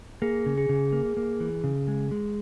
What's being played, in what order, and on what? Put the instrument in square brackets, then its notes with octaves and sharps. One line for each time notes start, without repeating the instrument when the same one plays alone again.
[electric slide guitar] A#3 [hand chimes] G#4
[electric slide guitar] C#3
[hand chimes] G#4
[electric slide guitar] C#3
A#3
A#3
E3
C#3
G#3
G#3